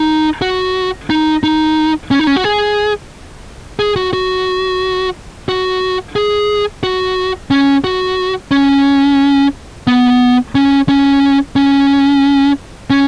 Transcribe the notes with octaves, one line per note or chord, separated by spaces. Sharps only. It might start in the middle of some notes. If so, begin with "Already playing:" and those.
Already playing: D#4
F#4
D#4
D#4
C#4
D#4
C#4
F#4
G#4
G#4
F#4
F#4
F#4
G#4
F#4
C#4
F#4
C#4
B3
C#4
C#4
C#4
C#4